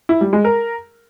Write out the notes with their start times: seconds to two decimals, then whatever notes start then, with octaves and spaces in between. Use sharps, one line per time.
0.09 E4
0.21 G3
0.33 G#3
0.45 A#4